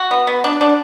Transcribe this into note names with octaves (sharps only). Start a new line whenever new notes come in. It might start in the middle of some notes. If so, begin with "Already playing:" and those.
Already playing: F#4
B3
B3
D4
D4